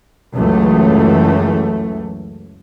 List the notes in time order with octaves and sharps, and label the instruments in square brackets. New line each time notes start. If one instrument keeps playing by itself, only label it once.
[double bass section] C#2 F#2 E3 A3